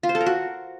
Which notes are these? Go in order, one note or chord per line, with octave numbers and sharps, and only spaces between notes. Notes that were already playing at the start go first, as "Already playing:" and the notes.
F4
C5
A4
A#4
F#4